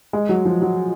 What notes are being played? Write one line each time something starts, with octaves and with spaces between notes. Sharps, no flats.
G#3
F#3
F3
F#3